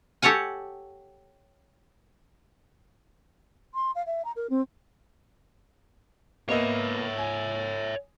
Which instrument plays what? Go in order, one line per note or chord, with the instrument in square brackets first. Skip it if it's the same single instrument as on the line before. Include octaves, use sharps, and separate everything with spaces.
[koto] G4 A4 C#5 F#5 G#5
[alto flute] C6
F5
E5
A#5
A#4
C4
[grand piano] A#3 B3 D#5 [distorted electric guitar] C#5 E5
[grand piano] G#5